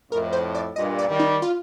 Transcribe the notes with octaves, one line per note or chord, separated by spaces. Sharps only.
F2 A2 A#4
C5
D5
G2 A#2 D#5
D5
D#3 G3
D#4
F4